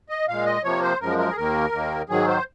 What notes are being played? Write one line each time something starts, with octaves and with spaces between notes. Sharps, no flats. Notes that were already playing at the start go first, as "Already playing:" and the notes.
D#5
A#2 G#3 F5
D#5
C3 F3 A#3 C#5
C5
F#2 F3 G#3 A#4
A#4
G#4
D#2 D#3 A#3 A#4
D#2 D#3 A#3
G#2 D#3 F#3 G#4
C5